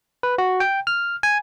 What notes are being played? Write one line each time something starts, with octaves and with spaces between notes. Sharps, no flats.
B4
F#4
G5
F6
G#5